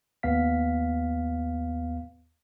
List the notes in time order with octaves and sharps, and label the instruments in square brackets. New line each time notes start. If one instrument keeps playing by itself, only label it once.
[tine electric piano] D#2 B3 F5 B6